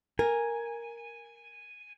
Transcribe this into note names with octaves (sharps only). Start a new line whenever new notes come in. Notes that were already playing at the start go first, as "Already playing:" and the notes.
A#4 G#5